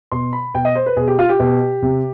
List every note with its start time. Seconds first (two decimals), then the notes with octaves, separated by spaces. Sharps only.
0.12 B2 C6
0.33 B5
0.54 B2 G5
0.65 D#5
0.75 C5
0.86 B4
0.96 B2 G#4
1.08 G4
1.19 F4
1.29 G4
1.39 B2
1.82 C3